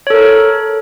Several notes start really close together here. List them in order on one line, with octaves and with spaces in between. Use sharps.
C#5 A4 A#4